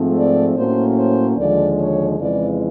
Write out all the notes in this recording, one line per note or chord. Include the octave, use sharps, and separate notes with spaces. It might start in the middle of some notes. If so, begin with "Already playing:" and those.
Already playing: G#2 F3 A3 C4
D5
A2 F#3 A#3 C#4 C5
C5
D#2 D3 F3 G#3 D5
C#5
F2 C#3 E3 G#3 D5